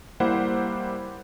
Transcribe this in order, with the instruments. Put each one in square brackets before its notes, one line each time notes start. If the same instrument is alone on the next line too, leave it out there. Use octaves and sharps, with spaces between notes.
[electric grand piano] G3 A#3 E4 G4 C5 F#5